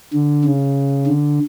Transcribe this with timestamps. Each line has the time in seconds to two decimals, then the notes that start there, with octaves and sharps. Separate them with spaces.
0.13 D3
0.45 C#3
1.07 D3